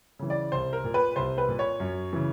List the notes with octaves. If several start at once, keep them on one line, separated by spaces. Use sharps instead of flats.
C#3 E3
D5
C2 C5
A#4
A#2
B4
C2 C5
B4
A#2
C#5
F#2
C#3 E3